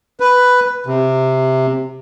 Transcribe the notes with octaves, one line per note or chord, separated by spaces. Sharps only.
B4
C3